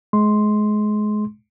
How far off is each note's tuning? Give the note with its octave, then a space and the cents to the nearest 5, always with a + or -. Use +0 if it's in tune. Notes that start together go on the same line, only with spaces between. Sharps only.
G#3 +25 C6 +0